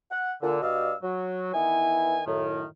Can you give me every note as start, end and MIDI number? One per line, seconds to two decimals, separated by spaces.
0.11 0.33 78
0.43 0.61 46
0.43 0.61 50
0.62 0.93 43
0.62 0.93 66
0.62 0.93 74
0.62 0.93 75
0.62 0.93 77
0.62 0.93 88
1.04 1.51 54
1.54 2.21 51
1.54 2.21 52
1.54 2.21 59
1.54 2.21 64
1.54 2.21 80
2.27 2.64 42
2.27 2.64 45
2.27 2.64 51